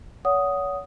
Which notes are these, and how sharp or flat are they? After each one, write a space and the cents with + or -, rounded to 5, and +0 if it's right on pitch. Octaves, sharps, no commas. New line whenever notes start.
C#5 +35 F#5 +0 D#6 +0